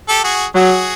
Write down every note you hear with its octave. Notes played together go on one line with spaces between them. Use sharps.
G4 A4
F#4 G#4
F#3 F#4 G#4